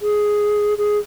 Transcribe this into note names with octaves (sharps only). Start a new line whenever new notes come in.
G#4
G#4